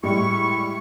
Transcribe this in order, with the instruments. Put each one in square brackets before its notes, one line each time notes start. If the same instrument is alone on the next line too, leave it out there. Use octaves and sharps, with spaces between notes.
[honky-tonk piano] A2 G3 G#3 [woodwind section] E4 C#6